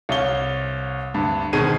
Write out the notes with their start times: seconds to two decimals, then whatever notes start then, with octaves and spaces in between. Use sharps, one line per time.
0.09 C2 C#5 F5 G7
1.14 D2 G2
1.53 G#1 B2 D#3 G#3 G#6 D#7